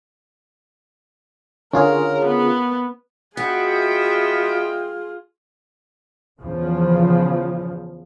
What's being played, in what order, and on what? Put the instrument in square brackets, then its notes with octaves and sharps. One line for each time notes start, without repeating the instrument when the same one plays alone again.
[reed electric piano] D3 [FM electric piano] C#4 F4 G#4 [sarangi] A#4
[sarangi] B3
[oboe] B3 [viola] F4 G#4 [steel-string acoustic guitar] F#4 [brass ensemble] D#5 E5 G5
[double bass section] E2 C#3 F3